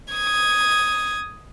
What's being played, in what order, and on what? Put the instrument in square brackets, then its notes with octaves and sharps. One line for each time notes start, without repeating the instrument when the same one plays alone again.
[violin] D#6 G#6